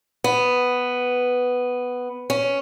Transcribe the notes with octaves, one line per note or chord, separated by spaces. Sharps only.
B3
C#4